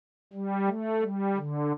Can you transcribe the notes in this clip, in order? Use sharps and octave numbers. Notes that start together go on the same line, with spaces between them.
G3
A3
G3
D3